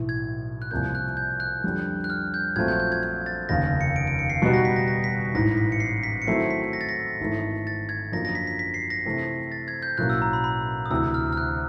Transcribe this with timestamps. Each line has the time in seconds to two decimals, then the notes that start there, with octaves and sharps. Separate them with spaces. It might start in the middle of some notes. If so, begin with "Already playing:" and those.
Already playing: B1 A2 E3
0.09 G#6
0.62 F#6
0.71 C2 C3 F3 A#3 G6
0.95 F#6
1.17 G6
1.40 F#6
1.64 F2 D3 G3
2.04 F#6
2.10 F6
2.34 G6
2.56 A#1 A#2 F#3 A3 C4 G#6
2.68 G6
2.79 G6
2.92 G#6
3.03 G#6
3.26 A6
3.49 F1 D#2 C#3 A#6
3.81 C#7
3.96 D7
4.07 D7
4.19 C#7
4.30 C7
4.42 B2 G3 B3 D#4 F#4 C7
4.54 A#6
4.65 B6
4.76 A#6
4.88 A#6
5.04 B6
5.35 A1 G#2 E3 A#6
5.57 B6
5.72 C#7
5.80 C7
6.03 B6
6.22 C#7
6.27 D#3 F#3 A3 C4 E4 C7
6.50 B6
6.73 A#6
6.81 A6
6.89 A#6
7.20 G#1 G#2 E3 A3
7.67 A6
7.89 G#6
8.12 F#2 D3 F3 A#3 D#4 A#6
8.25 A#6
8.35 B6
8.47 B6
8.59 B6
8.74 C7
8.90 A#6
9.05 C3 E3 A3 C4
9.52 A6
9.68 G#6
9.82 G6
9.98 B1 A2 F#3 A#3 C#4 F#6
10.10 E6
10.22 A#5
10.33 B5
10.44 B5
10.86 D#6
10.90 D2 C3 E3 E6
11.14 F6
11.33 F6
11.37 F#6